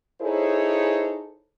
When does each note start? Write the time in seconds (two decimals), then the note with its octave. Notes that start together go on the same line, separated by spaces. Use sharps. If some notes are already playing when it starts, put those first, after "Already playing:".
0.21 D#4 E4 G#4 A4 C5 C#5